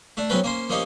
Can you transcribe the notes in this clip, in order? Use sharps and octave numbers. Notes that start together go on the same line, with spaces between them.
A3 D4
B1 F#3 C4 C#4 B4 G5
A#3 C#4 C5
F3 A#3 C#4 D#4 G4